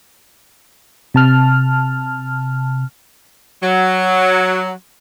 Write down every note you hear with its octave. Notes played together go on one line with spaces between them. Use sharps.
C3 A5 F6
F#3